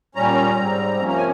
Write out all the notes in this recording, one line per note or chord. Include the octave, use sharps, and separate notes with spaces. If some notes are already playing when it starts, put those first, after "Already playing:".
A#2 G3 C#4 A#5
G#2 G3 C4
C3 F3 A#3 C#4
A#5
G#5